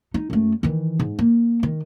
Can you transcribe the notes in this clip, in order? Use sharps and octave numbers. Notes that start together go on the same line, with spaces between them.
D#4
F#2 A3
D#3 E3
G#2
A#3
D#3